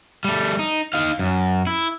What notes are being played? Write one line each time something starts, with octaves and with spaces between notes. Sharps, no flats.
G3 A3
D#4
D#4 F5
F#2
E4